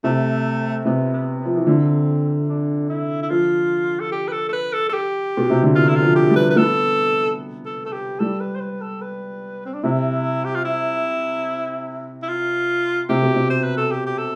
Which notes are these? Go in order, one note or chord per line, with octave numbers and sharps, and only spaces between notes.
C3 A3
C3 B3
B3
F3 B3
E3
D3 C4
D4
E4
E4
F3 F4
A4
G4
B4
A4
A4
B4
A4
A4
G4
B2
C3
D3
E3 F4
E4
F4
F3
G4
G3
B4
B4
B3 A4
A4
A4
G4
G3 A4
B4
C5
B4
A4
B4
C4
D4
C3 E4
G4
F4
E4
E4
F4
C3 G4
B2
C3
C5
B4
A4
G4
G4
A4